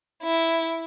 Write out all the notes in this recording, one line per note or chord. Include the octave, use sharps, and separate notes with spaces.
E4